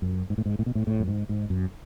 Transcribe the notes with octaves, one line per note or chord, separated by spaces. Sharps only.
F#2
G#2
A2
G#2
A2
B2
A2
A2
F#2
G#2
G#2
F#2